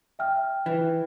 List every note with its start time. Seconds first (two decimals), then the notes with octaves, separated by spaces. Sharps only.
0.19 E5 G5 F6
0.66 E3